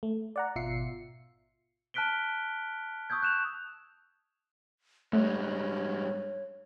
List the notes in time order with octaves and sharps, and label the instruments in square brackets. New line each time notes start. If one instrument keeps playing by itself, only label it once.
[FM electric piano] A3
D5 F#5 A#5
G#1 B2 F4 E5 C7 C#7
[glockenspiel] A5 F6 F#6 B6 D7 G7
C#6 D#6 E6 G6 G#6
F#6 E7 F7
[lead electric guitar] G#2 G3 [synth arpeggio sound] A3 [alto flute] C#5